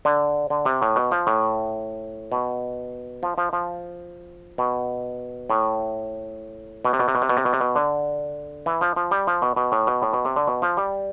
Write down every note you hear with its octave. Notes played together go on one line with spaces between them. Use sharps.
D3
D3
C3
A2
B2
F3
A2
B2
F3
F3
F3
B2
A2
B2
C3
B2
C3
B2
C3
B2
C3
B2
C3
B2
D3
E3
F3
F3
G3
F3
B2
B2
A2
B2
A2
B2
C3
D3
B2
F3
G3